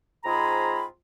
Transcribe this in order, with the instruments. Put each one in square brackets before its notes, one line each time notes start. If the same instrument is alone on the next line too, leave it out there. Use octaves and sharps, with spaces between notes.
[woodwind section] G#2 C4 F4 G#4 A#5 B5